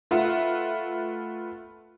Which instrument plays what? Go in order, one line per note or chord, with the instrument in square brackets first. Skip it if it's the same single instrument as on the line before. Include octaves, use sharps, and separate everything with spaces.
[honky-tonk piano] A3 F4 B4 E5 F#5